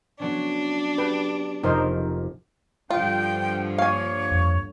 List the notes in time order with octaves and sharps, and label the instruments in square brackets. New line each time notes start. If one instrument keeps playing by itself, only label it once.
[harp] F#3 B3 C#4 [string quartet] D4
[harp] G4 [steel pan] B4
[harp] F1 F4 [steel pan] D#4 A#4 C5
[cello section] G2 D3 F3 [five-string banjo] F4 [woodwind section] G5
[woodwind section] A#3 C#5 [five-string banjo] F5 G#5
[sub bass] F2